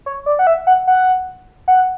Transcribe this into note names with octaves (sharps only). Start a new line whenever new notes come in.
C#5
D5
F#5
E5
F#5
F#5
F#5